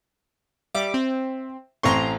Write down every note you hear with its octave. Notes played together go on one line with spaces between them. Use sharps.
G3 E5 D6
C4
A1 C4 A#5 C6 C#6